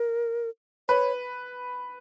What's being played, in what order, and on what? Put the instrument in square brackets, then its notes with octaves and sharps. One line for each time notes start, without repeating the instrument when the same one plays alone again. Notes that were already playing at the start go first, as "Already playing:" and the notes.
Already playing: [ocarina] A#4
[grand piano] B4 [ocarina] C#5